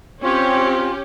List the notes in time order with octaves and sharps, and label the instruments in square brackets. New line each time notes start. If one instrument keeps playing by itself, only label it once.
[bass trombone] C4 [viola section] C#4 G4 [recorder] F4 [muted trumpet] C#5